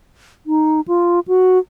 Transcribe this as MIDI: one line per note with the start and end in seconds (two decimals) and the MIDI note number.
0.47 0.81 63
0.88 1.20 65
1.28 1.58 66